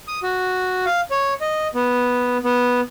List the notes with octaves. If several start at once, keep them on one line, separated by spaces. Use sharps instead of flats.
D#6
F#4
F5
C#5
D#5
B3
B3